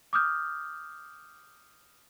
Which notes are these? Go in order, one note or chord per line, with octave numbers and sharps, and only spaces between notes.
D6 D#6 F6 G6